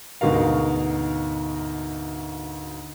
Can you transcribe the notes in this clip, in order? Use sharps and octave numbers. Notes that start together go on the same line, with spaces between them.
D2 G#2 B2 F#4 A#4 F5